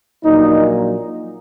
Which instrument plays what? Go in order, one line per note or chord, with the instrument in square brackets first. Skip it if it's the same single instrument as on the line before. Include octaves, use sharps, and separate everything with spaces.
[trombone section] A#1 A#2 F#3 D#4